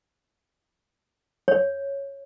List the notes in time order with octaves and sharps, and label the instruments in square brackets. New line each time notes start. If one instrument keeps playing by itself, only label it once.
[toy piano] C#5